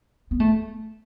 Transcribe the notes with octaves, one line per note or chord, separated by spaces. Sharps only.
B3
A3